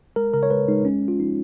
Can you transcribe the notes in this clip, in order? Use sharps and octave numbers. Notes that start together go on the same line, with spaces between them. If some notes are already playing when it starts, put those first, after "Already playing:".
G#3 A#4
C#3 A#4
C#5
G#3 B4
G#3 D#4
G#3 C#4
G#3
F4
F3 D#4